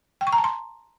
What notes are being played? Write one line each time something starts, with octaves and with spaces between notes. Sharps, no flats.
G5
C#6
A#5
A5
C6